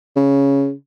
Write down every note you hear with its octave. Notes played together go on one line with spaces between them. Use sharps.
C#3